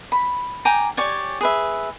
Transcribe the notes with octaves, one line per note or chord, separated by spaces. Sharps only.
B5
G5 G#5 A#5 D6
G4 C#5 D5 G#5
G#4 B4 E5